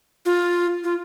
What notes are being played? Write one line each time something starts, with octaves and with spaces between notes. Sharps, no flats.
F4
F4